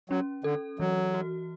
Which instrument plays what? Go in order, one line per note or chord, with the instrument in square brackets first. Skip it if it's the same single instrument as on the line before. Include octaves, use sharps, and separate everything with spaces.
[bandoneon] F#3 [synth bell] C#4
[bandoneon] D3 [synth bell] A4
[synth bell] E3 [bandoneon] F#3
[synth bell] F#4